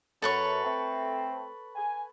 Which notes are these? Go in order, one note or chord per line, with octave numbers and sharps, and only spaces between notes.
F#2 A4 B4 C#5
A3 C4
G#5